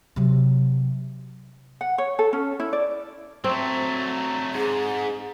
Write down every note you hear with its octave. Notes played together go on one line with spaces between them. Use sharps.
C3 F#3
F#5
C#5
A4
C#4
E4
D5
F#3 A3 C4
G#2 G#4